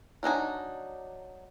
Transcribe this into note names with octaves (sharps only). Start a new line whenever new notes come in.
F#3 D4 D#4 G#5